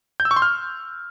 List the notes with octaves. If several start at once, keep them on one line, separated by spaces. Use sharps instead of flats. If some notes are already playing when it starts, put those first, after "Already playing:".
G6
E6
C#6
C6
F6